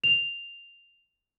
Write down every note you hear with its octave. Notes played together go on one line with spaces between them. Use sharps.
F7